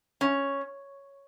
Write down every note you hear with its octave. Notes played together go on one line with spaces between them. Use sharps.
C#4